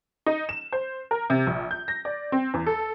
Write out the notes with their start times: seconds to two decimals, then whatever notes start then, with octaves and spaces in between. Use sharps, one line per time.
0.26 D#4
0.49 E7
0.72 C5
1.11 A#4
1.30 C3
1.47 A#1
1.71 G6
1.88 A#6
2.05 D5
2.32 C4
2.54 E2
2.66 A4